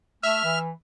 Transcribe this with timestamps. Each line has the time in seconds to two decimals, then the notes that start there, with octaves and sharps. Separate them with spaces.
0.23 A3 E5 F6
0.44 E3